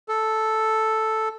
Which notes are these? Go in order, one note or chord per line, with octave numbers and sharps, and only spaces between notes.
A4